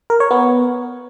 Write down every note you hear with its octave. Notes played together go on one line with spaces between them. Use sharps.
A#4
C#5
B3